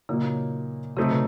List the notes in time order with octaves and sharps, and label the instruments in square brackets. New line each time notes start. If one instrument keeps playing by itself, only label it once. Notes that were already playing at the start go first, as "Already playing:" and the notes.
[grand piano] A#2 F#3 A#3 D#4 [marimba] C#3
[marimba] C#3 [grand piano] F#3 A3 C4 D#4
[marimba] C3
B2